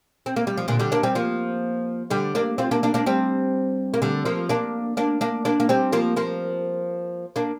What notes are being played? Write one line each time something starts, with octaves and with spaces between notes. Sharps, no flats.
C4
A#3
G3
F3
A#2 D3
D3 G3
A#3 D4
G3 C4
F3 A#3
D3 G3
A#3 D4
C4 F4
A#3 D4
A#3 D4
A#3 D4
G3 C4
A#3
D3 G3
F3 A#3
A#3 D4
A#3 D4
A#3 D4
A#3 D4
A#3
G3 C4
F3 A#3
F3 A#3
A#3 D4